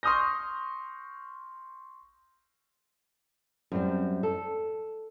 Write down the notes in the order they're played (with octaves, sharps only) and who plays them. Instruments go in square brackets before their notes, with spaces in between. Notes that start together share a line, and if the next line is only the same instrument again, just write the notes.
[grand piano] C6 C#6 D#6 F6 G6 A#6
[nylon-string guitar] F#2 G3 C4
A4